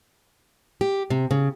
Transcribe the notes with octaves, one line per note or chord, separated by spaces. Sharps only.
G4
C3
C#3